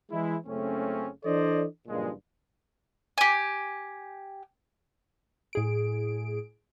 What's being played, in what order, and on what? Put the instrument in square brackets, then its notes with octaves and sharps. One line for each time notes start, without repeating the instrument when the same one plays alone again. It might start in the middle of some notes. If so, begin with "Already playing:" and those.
[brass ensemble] E3 G#3 E4
F#1 C#3 A3 C4 C#4
E3 D4 A4 C5 D5 D#5
F#1 G2 A#2 F3 G#3
[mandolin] G4 G#5
[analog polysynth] A2 G#4 D7